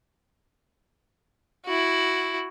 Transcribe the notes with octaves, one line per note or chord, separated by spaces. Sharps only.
E4 F#4